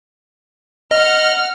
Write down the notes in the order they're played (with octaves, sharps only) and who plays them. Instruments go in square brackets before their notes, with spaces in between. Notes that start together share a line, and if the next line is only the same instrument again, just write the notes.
[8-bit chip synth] D#5 [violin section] F#5 F6